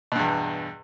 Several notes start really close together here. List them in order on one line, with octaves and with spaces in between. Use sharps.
B2 G2 E2